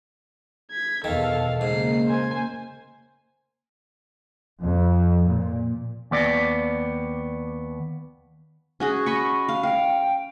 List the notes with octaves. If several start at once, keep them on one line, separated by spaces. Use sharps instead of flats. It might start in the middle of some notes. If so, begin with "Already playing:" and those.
G#6 B6
E2 B2 D#3 A4 F5
G#2 C#3 A#3 C7
C5 G#5
F2
A#2
D#2 B3 D5
C#4 F#4 G#4
D#5 B5 C#6
F5
F5 G5